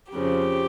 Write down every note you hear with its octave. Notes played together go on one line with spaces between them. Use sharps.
F2 C#3 F3 G4